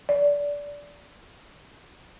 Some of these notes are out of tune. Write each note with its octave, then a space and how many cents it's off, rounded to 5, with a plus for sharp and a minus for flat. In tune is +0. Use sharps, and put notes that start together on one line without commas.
D5 -20